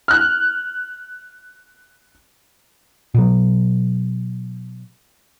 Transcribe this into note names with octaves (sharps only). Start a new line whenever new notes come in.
F6 F#6
B2 F#3